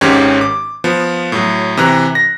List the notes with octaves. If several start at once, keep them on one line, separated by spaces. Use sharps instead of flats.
G#1 G#2 D#3 C#4 G4 C#5
D6
F3 B3
A2 F#3
C3 E3 A#5 F#6
A#6